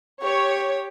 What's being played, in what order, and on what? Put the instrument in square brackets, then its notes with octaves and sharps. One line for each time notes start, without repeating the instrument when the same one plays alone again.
[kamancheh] G4 [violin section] C#5